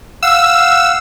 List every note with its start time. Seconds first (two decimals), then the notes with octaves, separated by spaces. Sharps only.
0.23 F5 F#5 E6